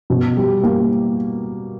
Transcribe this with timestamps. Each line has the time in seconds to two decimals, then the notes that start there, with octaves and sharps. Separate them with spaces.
0.10 B2
0.37 G3
0.64 A#3